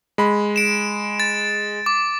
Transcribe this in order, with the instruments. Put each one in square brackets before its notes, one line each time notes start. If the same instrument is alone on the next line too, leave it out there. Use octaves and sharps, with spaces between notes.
[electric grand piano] G#3 B5
[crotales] D7 E7
A6
D6